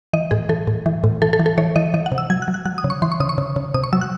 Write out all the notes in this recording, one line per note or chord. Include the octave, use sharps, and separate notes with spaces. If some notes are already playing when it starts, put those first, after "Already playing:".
E3 D#5
A2 G#4
E3 A4
A2
E3
A2
E3 A4
A4
E3
A4
E3 C#5
E3 D#5
E3 D#5
F#5
C3
E6
F#3 G#6
F#6
F#3
F#6
F#3 F#6
D#6
C#3
C#6
E3 C6
C#6
C#3 D#6
C#6
C#3
C#3
C3 D#6
C#6
F#3 E6
F#6